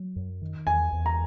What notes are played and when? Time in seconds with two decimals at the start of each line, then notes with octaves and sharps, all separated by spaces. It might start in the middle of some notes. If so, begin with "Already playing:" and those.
Already playing: F#3
0.16 F#2
0.42 D#3
0.67 E2 G#5
0.92 E2
1.06 A#5